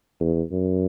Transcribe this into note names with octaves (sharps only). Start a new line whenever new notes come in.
E2
F#2